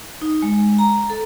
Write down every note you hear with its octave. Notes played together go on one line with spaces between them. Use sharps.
D#4
G#3
A#5
A4